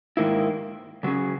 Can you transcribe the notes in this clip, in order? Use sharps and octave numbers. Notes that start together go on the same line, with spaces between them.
G#2 D#3 A#3 E4
C#3 F#3 C#4 G#4